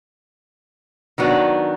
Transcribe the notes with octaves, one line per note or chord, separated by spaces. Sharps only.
D#3 F#3 B3 D4